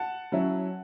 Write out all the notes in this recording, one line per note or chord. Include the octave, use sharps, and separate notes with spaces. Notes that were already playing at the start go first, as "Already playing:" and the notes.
Already playing: F#5 A5
F#3 C#4 E4